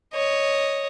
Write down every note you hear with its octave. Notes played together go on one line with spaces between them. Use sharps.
C#5 D#5